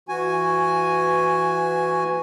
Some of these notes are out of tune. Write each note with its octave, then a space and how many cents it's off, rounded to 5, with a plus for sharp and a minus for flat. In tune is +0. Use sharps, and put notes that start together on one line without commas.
E3 +25 F#4 +0 G#5 +0